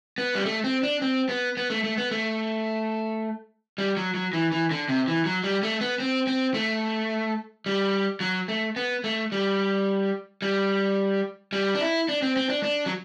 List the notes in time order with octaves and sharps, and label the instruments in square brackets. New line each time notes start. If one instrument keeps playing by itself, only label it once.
[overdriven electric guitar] B3
G3
A3
C4
D4
C4
B3
B3
A3
A3
B3
A3
G3
F#3
F#3
E3
E3
D3
C3
E3
F#3
G3
A3
B3
C4
C4
A3
G3
F#3
A3
B3
A3
G3
G3
G3
D4
E4
D4
C4
C4
D4
D4
F#3